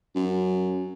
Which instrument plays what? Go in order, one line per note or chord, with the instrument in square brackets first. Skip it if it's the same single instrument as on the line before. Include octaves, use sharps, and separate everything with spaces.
[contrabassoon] F#2